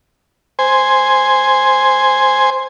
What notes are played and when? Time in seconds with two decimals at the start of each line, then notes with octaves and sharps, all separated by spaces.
0.59 C5 G#5